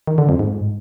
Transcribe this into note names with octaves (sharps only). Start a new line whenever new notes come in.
D#3
D3
F2
G#2